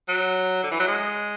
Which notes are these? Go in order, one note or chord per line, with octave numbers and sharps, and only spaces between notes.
F#3
D3
E3
F#3
G#3